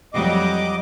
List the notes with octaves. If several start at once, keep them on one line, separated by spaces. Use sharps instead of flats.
F2 F#3 G3 D#5 D6